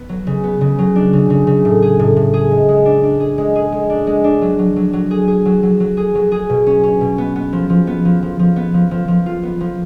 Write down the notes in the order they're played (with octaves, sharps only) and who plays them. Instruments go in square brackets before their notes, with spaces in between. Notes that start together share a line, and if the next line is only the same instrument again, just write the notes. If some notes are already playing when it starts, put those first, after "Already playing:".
Already playing: [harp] B3
F#3
C#3
B3
C#3
F#3
D4
C#3
C#3
C#3
A2
G#4
A2
A2
G#4
G#3
G#3
D4
D4
G#4
G#3
G#4
G#3
D4
G#3
D4
F#3
F#3
F#3
F#3
G#4
G#4
F#3
F#3
F#3
G#4
F#3
G#4
B2
C#4
C#4
B2
B3
B3
F3
F3
B3
F3
F3
F3
B3
F3
F3
F3
F4
B3
F3